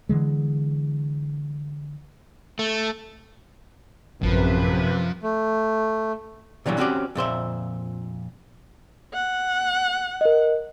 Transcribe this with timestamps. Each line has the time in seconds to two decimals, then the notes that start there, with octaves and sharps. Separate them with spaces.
0.09 D3 E3 G#3
2.59 A3
4.22 A1 F#2 C3 F3 B4
5.23 A3
6.66 A#2 D3 E3 F#3 G3
6.78 C4 C#4 F#4 G4 C#5 D5
7.15 F2 A#2 C5 E5
9.14 F#5
10.21 A#4 D#5